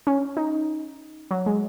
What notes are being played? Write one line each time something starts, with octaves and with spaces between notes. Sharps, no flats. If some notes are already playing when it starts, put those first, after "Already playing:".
C#4
D#4
F#3
G#3